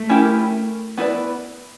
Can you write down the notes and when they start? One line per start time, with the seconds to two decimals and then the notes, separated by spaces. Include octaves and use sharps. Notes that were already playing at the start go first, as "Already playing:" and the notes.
Already playing: A3
0.09 C#4 E4 G4 A#4
0.97 B3 E4 G#4 B4 D5